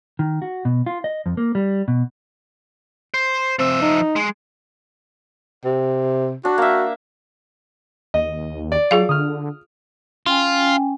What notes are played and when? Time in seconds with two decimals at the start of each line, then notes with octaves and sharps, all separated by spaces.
0.19 D#3
0.42 F#4
0.65 B2
0.86 F4
1.04 D#5
1.26 F2
1.37 A#3
1.55 G3
1.88 B2
3.14 C5
3.59 F3 C4 E5
3.82 D#4
4.16 G#3
5.65 C3
6.45 D4 F#4
6.58 A#3 E5
8.14 D#2 D#5
8.72 D5
8.91 F#3 F4 G#4 F5
9.09 D3 D#6 F6
10.27 C#4 F4 G5 G#5